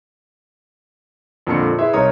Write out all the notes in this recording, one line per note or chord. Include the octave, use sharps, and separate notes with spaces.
F2 A#2 D3 A5 E6 C#7
E4 G#4 B4 E5 C6
C2 D#4 A#4 C#5 A#5 D#6